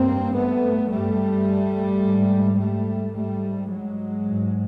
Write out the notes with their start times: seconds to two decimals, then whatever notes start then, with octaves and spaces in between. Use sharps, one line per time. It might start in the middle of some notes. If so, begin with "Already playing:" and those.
Already playing: G2 A#3 C4
0.35 A3 B3
0.91 G2 G3 A3
2.03 G#2
2.59 G3 A3
3.14 G#2 G3 A3
3.70 F#3 G#3
4.25 G#2